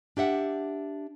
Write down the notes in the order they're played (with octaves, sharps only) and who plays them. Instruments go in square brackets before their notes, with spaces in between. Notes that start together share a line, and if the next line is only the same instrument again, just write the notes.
[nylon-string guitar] D4 G4 E5 F#5